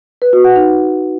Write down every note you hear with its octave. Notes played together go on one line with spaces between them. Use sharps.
B4
F#4
F#5
D#4